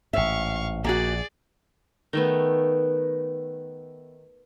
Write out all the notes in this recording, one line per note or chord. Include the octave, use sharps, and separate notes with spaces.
A1 G#2 E5 F5 C#6
A#1 A#3 F#4 G#4 D5
D#3 A3 B3